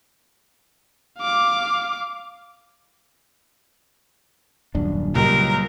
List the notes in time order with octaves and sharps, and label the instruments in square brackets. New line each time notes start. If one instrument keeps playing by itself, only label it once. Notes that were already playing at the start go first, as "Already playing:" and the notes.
[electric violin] F5 D6
[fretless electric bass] D#1 F#2 D4
[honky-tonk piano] C#2 [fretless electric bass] A#2 F#3 G3 [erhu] A#4